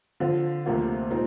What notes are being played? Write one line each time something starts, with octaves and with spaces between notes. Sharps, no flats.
D3 F3 C4 F4
D2 C3 F3 A#3 F4
A#2 G#3 C4 D#4